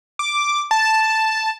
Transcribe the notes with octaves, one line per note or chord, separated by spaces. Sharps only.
D6
A5